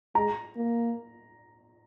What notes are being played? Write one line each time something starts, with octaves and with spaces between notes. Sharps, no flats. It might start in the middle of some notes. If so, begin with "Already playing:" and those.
G#3 A#5
A#3